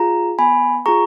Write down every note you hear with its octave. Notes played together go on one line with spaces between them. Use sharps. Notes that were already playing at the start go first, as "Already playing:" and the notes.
Already playing: F4 G#4 A#5
B3 G#5 B5
F4 G#4 A#5 C#6